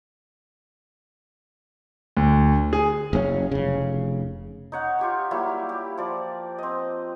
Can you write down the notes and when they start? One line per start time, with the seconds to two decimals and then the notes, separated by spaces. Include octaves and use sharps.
2.17 D2
2.73 G#4
3.13 F#1 C#3 C#4
3.52 F1 C#3
4.72 D#4 C#5 F#5
4.99 F4 G4 C#6
5.31 F#3 G3 A#3 E4
5.69 G4
5.98 F3 D5
6.59 C4 D#5